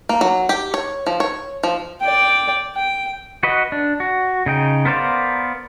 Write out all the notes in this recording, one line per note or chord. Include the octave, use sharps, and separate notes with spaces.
A#3
F#3
G4
C#5
F3
C#5
F3
D5 G5
G5
F#4 B4 D#5
D4
F#4
C#3 D#4 G5
B3 A#4 C5 D5 F5